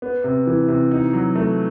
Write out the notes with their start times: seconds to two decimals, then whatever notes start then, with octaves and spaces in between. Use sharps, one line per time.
0.02 B3
0.24 C3
0.47 E3
0.68 C3
0.91 D#4
1.13 F#3
1.36 A3